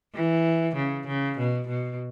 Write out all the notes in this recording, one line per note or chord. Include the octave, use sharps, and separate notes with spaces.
E3
C#3
C#3
B2
B2